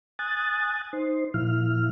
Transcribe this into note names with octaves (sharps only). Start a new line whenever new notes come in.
G#5 D#6 F#6 A6
D#4 C5
A#2 F3 E4 F6